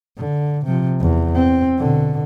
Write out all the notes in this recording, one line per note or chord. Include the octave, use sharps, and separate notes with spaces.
D3
C3 F3
E2
C4
B2 D3